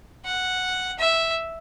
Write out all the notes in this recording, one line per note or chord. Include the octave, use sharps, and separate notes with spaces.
F#5
E5